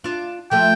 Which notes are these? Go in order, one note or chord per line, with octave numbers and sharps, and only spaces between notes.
D4 F4
F3 A3 G5